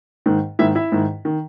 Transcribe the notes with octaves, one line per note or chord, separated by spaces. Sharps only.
G#2 D#3
G#2 D#3 E4 E5
E4 E5
G#2 D#3
D#3